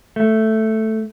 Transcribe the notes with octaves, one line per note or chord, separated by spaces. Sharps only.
A3